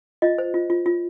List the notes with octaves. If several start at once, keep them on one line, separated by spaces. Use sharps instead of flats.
F4 D#5
C5
F4
F4
F4